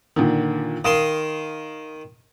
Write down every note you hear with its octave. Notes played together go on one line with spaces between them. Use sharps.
A#2 D3 D#3
D#3 F5 C6 D#6